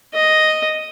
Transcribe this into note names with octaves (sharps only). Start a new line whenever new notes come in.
D#5